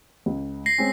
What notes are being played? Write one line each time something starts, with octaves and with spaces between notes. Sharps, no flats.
C#2
A#6 C7
G#3 C4 C#4